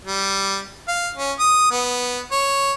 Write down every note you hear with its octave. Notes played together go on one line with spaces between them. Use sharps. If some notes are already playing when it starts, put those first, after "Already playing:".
G3
F5
C#4
D#6
B3
C#5